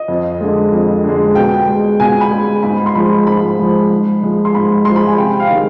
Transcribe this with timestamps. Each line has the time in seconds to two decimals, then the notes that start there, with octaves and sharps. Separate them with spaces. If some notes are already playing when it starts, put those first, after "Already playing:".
Already playing: D#5
0.08 F2
0.41 D3 G#3
0.72 F2
1.04 D3 G#3
1.35 B2 G5
1.68 G#3
2.00 B2 G#5
2.21 B5
2.31 G#3
2.63 G#2 B5
2.86 C6
2.95 F3 G#3 B5
3.27 G#2 B5
3.59 F3 G#3
3.91 G#2
4.23 F3 G#3
4.45 C6
4.55 G#2 B5
4.85 F3 G#3 C6
4.96 B5
5.07 G#5
5.18 C3 G5
5.40 F5
5.50 D#3 G#3